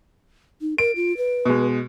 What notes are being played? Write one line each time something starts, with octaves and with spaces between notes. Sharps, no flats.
D#4
A#4 D7
F4
B4
B2 G#3